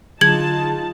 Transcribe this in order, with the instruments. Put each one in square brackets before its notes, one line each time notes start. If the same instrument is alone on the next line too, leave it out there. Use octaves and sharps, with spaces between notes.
[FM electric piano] D3 F#3 G#4 [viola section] D#4 F4 A5 [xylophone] G#6 F#7